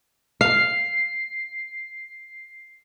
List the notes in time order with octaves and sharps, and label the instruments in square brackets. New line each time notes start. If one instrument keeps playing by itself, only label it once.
[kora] F5 [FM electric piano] C7